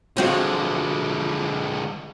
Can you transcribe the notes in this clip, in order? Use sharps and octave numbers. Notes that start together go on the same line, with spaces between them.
D3 F3 G#3 C4 F#4